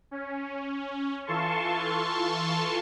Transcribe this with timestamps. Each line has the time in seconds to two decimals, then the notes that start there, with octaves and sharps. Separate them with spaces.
0.11 C#4
1.26 E3 F4 A4 A5 C6 C#6